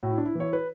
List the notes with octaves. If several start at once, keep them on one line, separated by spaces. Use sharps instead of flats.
A2 F#4
E4
D4
E4
E3 C#5
B4